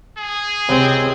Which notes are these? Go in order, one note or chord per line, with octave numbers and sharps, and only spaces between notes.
G#4
C#2 C3 C4